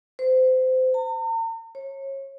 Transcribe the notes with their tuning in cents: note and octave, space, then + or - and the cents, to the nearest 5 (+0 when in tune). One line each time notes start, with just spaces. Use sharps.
C5 -25
A#5 -45
C#5 -30